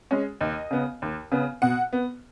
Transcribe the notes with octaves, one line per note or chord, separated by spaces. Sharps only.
G#3 C#4
D#2 D#5
C#3 B3
D#2
C#3 B3
B2 F#5
B3